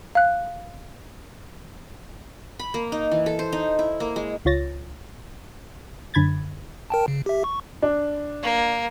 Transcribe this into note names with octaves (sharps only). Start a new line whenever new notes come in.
F5 F#6
B5
A#3
D#4
E3
A4
C5
D#4
E4
A#3
G#3
C#2 F4 C#5 A6 A#6
F#2 D3 B5 G#6 A6
A#4 G5 A5
C#3
G4 E5
C#6
D4
A#3